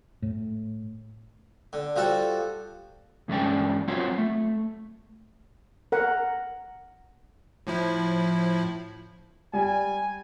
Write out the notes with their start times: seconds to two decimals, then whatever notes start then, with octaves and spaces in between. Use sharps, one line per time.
0.22 A2
1.73 D3
1.96 F3 G3 F#4 A4
3.28 G2 E3 G#3 C#4 D5 G5
3.88 F#3 C4 F4 C#5 F#5
4.18 A3
5.92 A#4 F#5
7.67 A2 F3 E4
9.53 G3 G#5